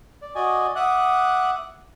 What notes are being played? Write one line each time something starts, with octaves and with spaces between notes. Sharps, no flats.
D5
F#4 D5 D#5 G#5
E5 F#5 D6 D#6 F#6